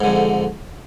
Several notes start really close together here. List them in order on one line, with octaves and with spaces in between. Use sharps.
G#2 D3 F2